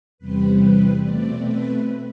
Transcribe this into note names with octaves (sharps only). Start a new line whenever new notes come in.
E2 C3 G3 C4 B4
B4
B2 A3 C4 D5
B4